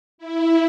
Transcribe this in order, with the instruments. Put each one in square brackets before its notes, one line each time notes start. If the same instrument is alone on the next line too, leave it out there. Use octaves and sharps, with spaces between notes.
[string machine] E4